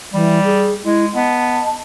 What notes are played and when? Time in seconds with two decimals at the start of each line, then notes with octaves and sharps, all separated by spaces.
0.14 E3 G3
0.44 G#4
0.85 G#3 E4
1.15 B3 D#5 A5